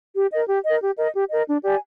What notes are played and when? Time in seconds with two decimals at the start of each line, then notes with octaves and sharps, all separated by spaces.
0.16 G4
0.31 A#4 D#5
0.48 G4
0.65 A#4 D#5
0.81 G4
0.97 A#4 D#5
1.14 G4
1.31 A#4 D#5
1.47 D4
1.64 G4 D5 G#5